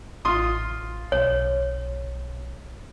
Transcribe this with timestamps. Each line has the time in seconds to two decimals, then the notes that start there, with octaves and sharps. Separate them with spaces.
0.25 A1 F4 C6 D#6
1.12 B1 C#5